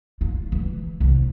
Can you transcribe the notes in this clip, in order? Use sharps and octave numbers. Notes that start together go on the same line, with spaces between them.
F4
E3
C2